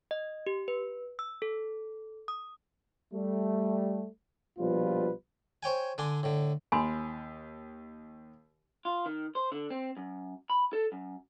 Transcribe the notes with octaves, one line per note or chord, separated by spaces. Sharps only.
D#5
G4
B4
E6
A4
D#6
G3 A3
A#1 B2 F3 G3 F4 B4
C5 C#5 G5 G#5
D3 D4 G#5 C6
A2 D3
D#2 G#5 B5 C6
F4
D#3
C5
D3
C4
F#2
B5
A4
F#2